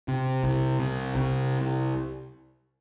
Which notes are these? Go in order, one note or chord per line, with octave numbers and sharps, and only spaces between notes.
C3
C2
C3
C2